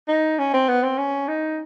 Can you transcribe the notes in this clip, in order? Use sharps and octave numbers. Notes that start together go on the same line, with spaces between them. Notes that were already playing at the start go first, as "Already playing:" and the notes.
D#4
C#4
C4
B3
C4
C#4
D#4